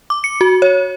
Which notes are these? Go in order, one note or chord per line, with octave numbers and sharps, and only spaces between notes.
D6
C#7
F#4
C#5